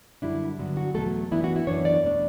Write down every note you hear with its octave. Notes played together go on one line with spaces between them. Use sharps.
F#2 D3 G3 D4 E4
G2 D3 F#3 B3
F#4
E2 B2 F#3 A3 A4
F#2 E3 B3 D4 E4
F#4
E4
F#2 E3 B3 D4 C#5
D5
E2 B2 A3 D4